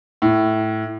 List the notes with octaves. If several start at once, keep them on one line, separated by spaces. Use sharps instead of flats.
A2